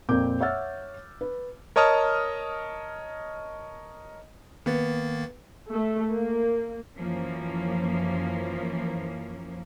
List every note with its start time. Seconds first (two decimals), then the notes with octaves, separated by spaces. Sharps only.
0.09 F2 A#2 C4 A#4 D6 G6
0.41 C#5 E5 F#5 E6 F6 A6
1.21 B4
1.76 A#4 C#5 D#5 A5 D#6 F6
4.66 D#3 A#3 B3 A6
5.71 A3
6.13 A#3
6.97 F#2 E3 F3 A#3 C#4